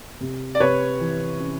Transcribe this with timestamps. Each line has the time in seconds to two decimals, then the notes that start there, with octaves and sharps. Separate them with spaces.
0.20 C3
0.55 D5
0.60 C3 B4 C#5
1.00 E3
1.40 C#4